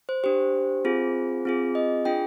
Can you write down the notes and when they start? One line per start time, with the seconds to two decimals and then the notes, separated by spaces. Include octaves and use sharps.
0.09 C5
0.24 D4 G4 C5
0.85 C4 F4 G#4
1.45 C4 F4 G#4
1.75 D#5
2.05 D4 F4 G#4 G5